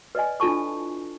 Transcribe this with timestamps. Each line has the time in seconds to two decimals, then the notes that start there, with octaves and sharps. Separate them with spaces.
0.15 B4 D5 D#5 G#5
0.40 D4 E4 F4 A4 A5 C#6